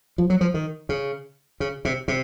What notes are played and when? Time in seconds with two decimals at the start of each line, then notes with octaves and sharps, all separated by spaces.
0.18 F3
0.30 F#3
0.41 F3
0.54 D#3
0.89 C#3
1.60 C#3
1.85 C3
2.08 C3